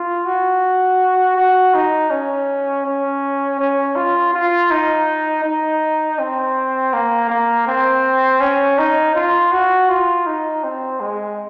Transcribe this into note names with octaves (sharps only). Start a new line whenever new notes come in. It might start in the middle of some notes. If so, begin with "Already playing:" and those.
Already playing: F4
F#4
F#4
D#4
C#4
C#4
C#4
F4
F4
D#4
D#4
C4
A#3
A#3
C4
C#4
D#4
F4
F#4
F4
D#4
C4
G#3